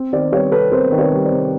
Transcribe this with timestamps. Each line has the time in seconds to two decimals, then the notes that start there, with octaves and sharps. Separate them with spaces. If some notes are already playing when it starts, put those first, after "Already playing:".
Already playing: C4
0.12 D#3 C5 D5
0.32 G3 B4 C#5
0.52 C3 A4 B4
0.71 C4 A#4 C5
0.92 D#3
0.98 B4 C#5
1.12 G3
1.25 C5 D5
1.32 C3